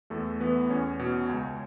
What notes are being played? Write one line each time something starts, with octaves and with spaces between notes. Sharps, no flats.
E2 A3 A4
E3 B3 B4
E2 C#4 C#5
B2
C#2